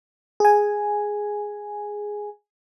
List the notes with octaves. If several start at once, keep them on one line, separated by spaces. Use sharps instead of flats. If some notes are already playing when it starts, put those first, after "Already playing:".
G#4 G#5